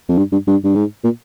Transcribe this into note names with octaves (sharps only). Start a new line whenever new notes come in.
F2
G2
G2
G2
G2
G#2
A#2